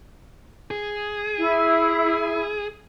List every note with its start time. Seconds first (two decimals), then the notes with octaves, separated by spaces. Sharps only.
0.71 G#4
1.38 E4